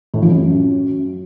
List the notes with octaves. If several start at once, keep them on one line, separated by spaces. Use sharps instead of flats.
A2
F3
F#2